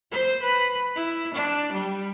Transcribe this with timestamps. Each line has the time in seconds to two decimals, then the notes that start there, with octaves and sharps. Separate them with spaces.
0.11 C5
0.43 B4
0.95 E4
1.34 D4
1.73 G3